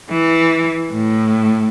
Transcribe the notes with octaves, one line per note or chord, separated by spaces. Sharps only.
E3
A2